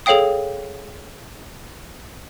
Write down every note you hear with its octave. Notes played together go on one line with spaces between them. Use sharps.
G#4 A4 C#5 F5 G5 D#6